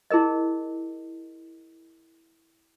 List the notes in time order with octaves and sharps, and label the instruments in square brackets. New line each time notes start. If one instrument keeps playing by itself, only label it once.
[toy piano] E4 G#4 A#4 D#5